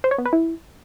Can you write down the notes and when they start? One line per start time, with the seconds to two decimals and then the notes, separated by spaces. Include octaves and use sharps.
0.04 C5
0.11 C#5
0.18 B3
0.26 B4
0.33 E4